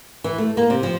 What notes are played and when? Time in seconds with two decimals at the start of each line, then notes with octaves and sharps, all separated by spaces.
0.24 E3
0.38 A3
0.57 A#3
0.70 C3
0.83 F3